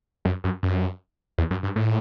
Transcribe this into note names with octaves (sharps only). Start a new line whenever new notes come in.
F#2
F#2
F#2
E2
F#2
G2
A2